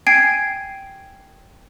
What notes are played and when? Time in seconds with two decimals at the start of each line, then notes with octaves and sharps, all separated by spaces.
0.07 G5 G#5 G#6 C7 D7